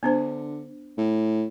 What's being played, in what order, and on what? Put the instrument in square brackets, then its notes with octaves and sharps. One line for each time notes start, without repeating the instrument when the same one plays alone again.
[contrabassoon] D3 [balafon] B3 D4 C5
[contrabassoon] A2